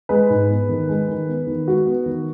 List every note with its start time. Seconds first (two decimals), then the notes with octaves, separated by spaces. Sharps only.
0.09 G#3 B4
0.30 G#2
0.50 B3
0.69 D#3
0.89 G#3
1.08 D#3
1.28 B3
1.47 D#3
1.67 G#3 F#4
1.86 B3
2.06 D#3